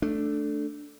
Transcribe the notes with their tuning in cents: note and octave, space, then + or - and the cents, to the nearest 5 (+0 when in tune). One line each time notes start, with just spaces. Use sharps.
A3 +0 D4 +0